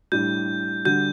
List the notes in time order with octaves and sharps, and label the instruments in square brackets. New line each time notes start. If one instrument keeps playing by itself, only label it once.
[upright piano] A2 G3 D4 [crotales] G6
[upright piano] D3 G3 D4 F#4 [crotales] G6